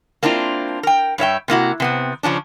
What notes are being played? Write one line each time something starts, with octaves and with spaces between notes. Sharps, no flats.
A#3 C4 D4 E4 F4
A#4 G5
G2 C#5 E5 G5
C3 A#3 E4 F#4
C3 B3 C4
C#3 F3 C#4 D4